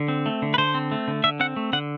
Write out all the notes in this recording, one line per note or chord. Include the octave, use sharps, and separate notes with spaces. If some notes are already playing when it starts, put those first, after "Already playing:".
Already playing: D3
C4
A3
D3
B4
D3 C5
C4
A3
D3
D3 E5
C4 F#5
A3
D3 F#5